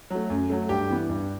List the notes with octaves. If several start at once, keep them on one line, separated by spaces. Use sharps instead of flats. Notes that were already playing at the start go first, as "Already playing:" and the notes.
F#3 A3
F#2
F#3 A3
G2 G4
E3 B3
G2